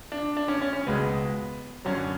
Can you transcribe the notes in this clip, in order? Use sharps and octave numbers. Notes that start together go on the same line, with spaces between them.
D4
D4
C#4
C#4
C#4
C#2 B2 G#3 B3
F#2 D3 F#3 C#4